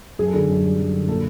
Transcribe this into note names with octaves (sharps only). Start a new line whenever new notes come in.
F#2 G#4
A4
D3 G#4
F#2
G3
F#2
D3
A#2 A4